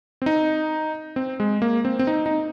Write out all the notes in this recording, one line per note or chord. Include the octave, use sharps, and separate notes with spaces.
C4
D#4
C4
G#3
A#3
C4
C4
D#4
D#4